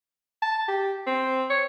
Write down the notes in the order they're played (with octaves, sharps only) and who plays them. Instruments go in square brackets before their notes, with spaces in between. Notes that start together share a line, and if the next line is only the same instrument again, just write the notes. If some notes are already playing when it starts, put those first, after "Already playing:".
[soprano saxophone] A5
G4
C4
C#5